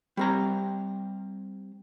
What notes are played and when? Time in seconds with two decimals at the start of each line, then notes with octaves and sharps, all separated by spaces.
0.17 G3 C4 A#5